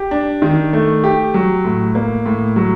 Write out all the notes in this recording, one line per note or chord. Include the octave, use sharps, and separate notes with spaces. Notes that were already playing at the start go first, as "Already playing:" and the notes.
Already playing: G4
D4
D#3
A3
G4
F#3
A2
A#3
A2
F#3